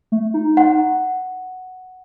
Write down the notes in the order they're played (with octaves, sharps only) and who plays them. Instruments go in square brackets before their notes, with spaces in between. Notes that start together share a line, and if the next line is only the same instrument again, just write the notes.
[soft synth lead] A3
D#4
[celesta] F#5